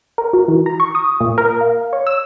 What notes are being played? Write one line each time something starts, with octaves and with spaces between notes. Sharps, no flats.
A#4
F#4
E3
A#5
C#6
D#6
A#2
A#4
F5
C#5
E6